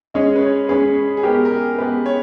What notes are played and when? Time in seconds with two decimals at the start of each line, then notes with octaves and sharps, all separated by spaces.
0.14 G#3 C#4 G#4 D#5
0.36 B4
0.42 C#5
0.69 G#3 C#4 G#4 B4
1.17 G#4
1.23 G#3 B3 G4 A#4
1.45 A#4
1.51 G#4
1.79 G#3 B3 G4 B4
2.06 C#5